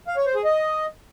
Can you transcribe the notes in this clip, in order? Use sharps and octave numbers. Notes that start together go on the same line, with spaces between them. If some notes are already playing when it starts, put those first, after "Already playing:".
F5
C#5
C5
G#4
D#5